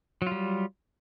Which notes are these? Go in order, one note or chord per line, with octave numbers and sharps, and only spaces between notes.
F#3 G3 F4